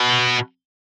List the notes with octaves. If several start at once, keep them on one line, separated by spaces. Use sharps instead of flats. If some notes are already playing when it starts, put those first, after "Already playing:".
Already playing: B2